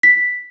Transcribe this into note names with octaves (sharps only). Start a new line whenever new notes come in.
B6